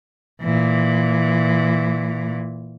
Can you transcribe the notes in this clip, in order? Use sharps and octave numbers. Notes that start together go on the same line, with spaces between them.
A#2 E3